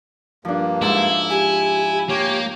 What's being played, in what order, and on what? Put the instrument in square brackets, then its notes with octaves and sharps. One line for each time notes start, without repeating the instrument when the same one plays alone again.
[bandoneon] G2 A#3 [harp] F3 D4
[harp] G#2 A5 [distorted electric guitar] E4 [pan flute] F5
[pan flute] G4 [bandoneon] G#5
[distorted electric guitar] A#3 [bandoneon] G4 C#5